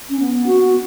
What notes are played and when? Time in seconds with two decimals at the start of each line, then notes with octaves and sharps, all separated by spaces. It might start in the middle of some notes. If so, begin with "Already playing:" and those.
0.10 C#4
0.20 B3
0.47 F#4